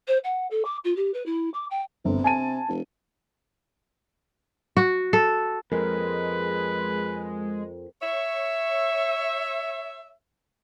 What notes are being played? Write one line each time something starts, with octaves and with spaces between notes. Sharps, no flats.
C5
F#5
A4
D6
F4
G4
B4
E4
D6
G5
G1 C3
G#5 A5 D#7
F1
F#4
A4
F2 G#3 A#4 B4
C#5 E5